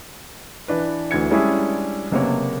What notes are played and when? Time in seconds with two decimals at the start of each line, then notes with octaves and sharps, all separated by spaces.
0.68 E3 D4 B4
1.11 D2 E3 G#6 C#7
1.31 G3 G#3 C#4 D4 E4 G#4
2.12 F#1 C3 A#3 B3 C#5